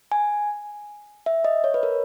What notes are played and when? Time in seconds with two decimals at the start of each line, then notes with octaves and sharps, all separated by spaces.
0.12 G#5
1.26 E5
1.45 D#5
1.64 C#5
1.74 B4
1.83 A#4